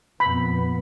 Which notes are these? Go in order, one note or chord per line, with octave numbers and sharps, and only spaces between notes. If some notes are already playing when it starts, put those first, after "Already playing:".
F2 A#2 B3 B5